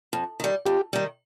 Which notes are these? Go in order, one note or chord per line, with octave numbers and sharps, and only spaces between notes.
F2
D#3 G3
F2 G4
D#3 G3